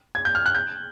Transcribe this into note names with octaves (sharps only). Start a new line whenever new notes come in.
G#6
G6
F6
F#6
G6